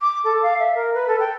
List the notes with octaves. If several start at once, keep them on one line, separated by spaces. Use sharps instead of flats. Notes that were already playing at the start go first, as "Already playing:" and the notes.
D6
A4
F5
E5
A#4
B4
A4
G5